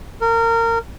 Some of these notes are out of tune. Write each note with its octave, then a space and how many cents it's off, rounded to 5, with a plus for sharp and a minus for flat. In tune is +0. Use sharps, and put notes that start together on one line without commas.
A#4 -25